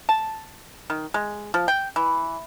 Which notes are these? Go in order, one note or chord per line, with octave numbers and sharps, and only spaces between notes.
A5
D#3
G#3
F3
G5
E3